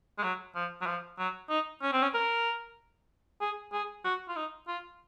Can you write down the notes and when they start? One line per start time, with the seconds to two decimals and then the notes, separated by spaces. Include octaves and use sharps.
0.19 G#3
0.24 F#3
0.55 F3
0.82 F#3
0.87 F3
1.19 F#3
1.50 D#4
1.82 C#4
1.93 C4
2.03 C#4
2.14 A#4
3.41 G#4
3.73 G#4
4.04 F#4
4.29 F4
4.36 D#4
4.68 F4